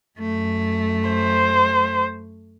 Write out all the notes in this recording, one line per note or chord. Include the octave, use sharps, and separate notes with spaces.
F#2 A3
C5